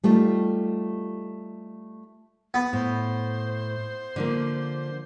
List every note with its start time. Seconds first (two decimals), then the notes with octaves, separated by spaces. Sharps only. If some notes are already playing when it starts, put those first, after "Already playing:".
0.04 G3 A3 D#4 F4 G4
2.54 B3
2.73 A2 C5
4.16 D3 F3 A#3